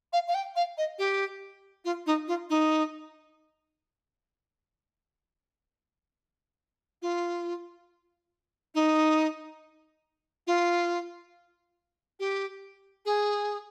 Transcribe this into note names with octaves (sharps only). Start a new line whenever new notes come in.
F5
F5
G5
F5
D#5
G4
F4
D#4
F4
D#4
F4
D#4
F4
G4
G#4